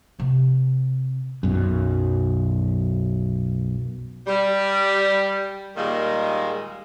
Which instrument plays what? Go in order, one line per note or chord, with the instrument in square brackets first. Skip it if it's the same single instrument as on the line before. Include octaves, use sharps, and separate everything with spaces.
[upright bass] C3 C4
[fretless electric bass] B1 F#2
[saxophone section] G3
A#2 D#3 G3 G#3 A#3